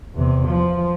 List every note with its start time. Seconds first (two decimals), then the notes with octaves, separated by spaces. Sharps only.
0.15 E2 C3
0.48 F3